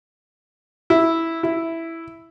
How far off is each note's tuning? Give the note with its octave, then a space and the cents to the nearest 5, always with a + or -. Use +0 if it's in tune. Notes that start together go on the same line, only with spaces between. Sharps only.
E4 -5
E4 +0